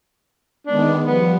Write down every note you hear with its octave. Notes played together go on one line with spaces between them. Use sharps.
D#3 G#3 B3 D4
F3 G3 B3